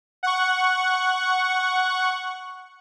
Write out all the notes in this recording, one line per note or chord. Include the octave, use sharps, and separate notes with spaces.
F#5 C#6